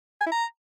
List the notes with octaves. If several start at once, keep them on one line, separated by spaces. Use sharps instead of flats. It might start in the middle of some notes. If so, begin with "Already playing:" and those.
G#5
E4
A#5